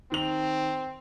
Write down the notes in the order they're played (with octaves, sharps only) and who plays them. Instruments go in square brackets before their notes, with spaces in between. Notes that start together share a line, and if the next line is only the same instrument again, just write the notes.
[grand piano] D#3 F7 [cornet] C4